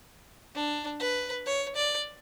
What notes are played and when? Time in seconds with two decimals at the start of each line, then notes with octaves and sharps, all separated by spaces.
0.55 D4
1.00 B4
1.46 C#5
1.76 D5